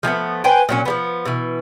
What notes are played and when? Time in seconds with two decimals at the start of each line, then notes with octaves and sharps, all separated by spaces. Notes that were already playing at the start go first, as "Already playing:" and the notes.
0.03 F3 G#3 A3 B3
0.44 B4 C5 G5 G#5
0.69 A#2 F#3 C#4
0.86 F3 G3 B3
1.25 B2 E3